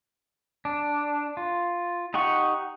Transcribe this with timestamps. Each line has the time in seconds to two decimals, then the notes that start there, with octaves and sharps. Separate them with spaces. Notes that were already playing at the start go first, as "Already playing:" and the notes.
0.65 D4
1.37 F4
2.14 D#4 G4 F#5 C#6